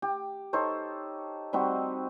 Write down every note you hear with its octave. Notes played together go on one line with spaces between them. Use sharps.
G4
D#4 A4 C5 C#5
G3 C4 D#4 F#4